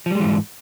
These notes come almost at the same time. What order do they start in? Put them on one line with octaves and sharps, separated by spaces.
F3 G3 G#3 E3 G#2